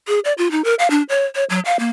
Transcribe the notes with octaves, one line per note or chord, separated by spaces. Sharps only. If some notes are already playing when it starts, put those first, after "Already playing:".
G#4
D5
F4
D#4
A#4
F5
D4
C#5
C#5
F#3
F5
A#3